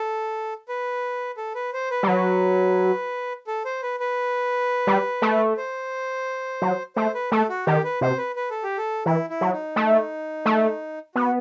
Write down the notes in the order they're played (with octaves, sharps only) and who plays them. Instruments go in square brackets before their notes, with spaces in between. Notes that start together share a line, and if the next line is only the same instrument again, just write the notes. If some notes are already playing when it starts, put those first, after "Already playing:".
Already playing: [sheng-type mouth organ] A4
B4
A4
B4
C5
B4
[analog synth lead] G3
[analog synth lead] F#3 [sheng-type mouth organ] B4
[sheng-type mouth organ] A4
C5
B4
B4
[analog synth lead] G3
A3
[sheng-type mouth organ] C5
[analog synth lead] F#3
[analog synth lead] A3 [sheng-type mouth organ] C5
[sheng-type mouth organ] B4
[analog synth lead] A3 [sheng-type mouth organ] A4
[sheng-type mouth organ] F#4
[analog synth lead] D#3 [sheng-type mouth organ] G4
[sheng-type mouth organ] B4
[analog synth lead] C3 [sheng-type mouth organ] C5
[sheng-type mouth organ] B4
B4
A4
G4
A4
[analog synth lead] E3 [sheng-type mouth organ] E4
[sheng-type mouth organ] E4
[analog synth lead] F#3
[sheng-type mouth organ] D#4
[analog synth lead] A3
A3
[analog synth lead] B3 [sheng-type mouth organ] F#4